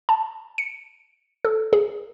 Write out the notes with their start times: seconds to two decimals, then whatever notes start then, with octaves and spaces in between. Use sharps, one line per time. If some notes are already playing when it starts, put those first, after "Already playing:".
0.09 A5
0.58 C#7
1.45 A4
1.73 G#4